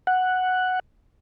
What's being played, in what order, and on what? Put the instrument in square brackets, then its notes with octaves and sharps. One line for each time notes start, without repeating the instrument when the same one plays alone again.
[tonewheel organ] F#5